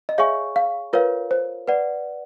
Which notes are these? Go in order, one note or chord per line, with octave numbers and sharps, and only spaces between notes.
D#5
G#4 C#5 E5 F5 G#5 C#6
F5
F4 A#4 B4 C#5 F5
C5
B4 D5 F#5